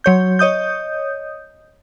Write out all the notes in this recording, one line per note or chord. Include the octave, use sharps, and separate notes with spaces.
F#3 C#5 G6
C#5 D#5 D#6 G6